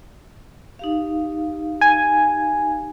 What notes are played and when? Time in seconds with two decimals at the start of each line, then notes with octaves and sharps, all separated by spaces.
0.79 D#4 G4 F5
1.81 G#5